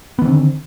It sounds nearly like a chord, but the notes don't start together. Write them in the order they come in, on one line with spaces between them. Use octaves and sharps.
B3 D#3 C4 D3